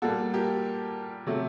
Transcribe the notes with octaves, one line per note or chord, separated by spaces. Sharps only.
A#2 G3 A#3 F#4 A4
G4 A#4
C3 F#3 A3